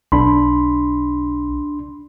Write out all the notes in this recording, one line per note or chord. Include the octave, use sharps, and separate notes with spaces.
B1 D4 B5 C6